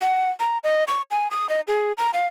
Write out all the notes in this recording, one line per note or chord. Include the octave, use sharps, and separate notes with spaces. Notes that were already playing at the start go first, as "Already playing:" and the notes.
F#5
A#5
D#5
C#6
G#5
D#6
D#5
G#4
A#5
F5